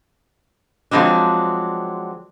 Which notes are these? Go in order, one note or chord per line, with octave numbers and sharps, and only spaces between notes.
F3 F#3 G#3 C4 D4